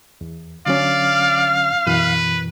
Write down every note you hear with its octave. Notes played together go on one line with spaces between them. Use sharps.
E2
D3 F#3 C#4 D5 F5
F#2 B2 E3 B4